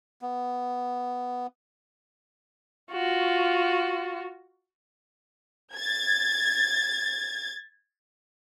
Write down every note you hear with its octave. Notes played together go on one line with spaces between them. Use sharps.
B3
F4 F#4
G#6 A6